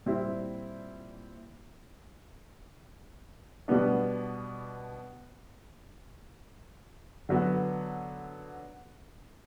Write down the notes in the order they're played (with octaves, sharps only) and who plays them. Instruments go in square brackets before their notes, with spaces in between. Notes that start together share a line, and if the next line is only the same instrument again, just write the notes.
[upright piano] A#2 G3 C4 E4
B2 G3 B3 D4
D3 F#3 B3